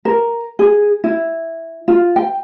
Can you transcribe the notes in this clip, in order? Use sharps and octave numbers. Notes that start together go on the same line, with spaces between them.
A#4
G#4
E4
F4
G5